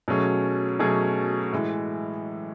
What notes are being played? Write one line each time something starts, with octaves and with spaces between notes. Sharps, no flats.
B2 F#3 A3 C#4 G#4
B2 F#3 A3 C#4 G#4
A2 E3 G#3